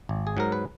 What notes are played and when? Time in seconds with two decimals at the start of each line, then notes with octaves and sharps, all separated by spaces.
0.09 G#1
0.27 G#4
0.37 G#2 F#3 A#4
0.52 B4